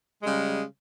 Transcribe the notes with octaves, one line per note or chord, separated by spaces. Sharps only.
C#3 G3 G#3